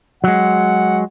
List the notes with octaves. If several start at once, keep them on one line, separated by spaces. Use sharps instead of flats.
F#3 G#3 F#5